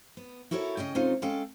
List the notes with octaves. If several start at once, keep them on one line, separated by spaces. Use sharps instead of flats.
B3
E4 F#4 A4 A#4 C5 C#5
C#3 C#4 D#5 G5
C3 G#3 C#4 D#4 F4 A4
G#3 C#4 A4 F5 G5